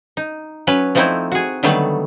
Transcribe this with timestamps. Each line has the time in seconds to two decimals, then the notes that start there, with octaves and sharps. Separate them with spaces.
0.17 D#4
0.67 F#3 C#4 B4
0.95 F3 A3 C4 D#4 E4
1.32 F#4 G#4
1.63 D3 D#3 F#3 G3 A3 B3